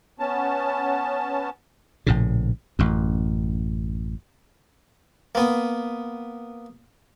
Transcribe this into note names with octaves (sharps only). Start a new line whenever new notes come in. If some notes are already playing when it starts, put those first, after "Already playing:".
B3 C#4 A5
A#1 A2 C#3
A1 F#2
A#3 B3